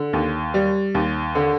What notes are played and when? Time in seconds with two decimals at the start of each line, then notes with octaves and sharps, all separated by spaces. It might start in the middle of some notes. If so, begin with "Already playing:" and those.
Already playing: D3
0.13 D#2
0.54 G3
0.95 D#2
1.35 D3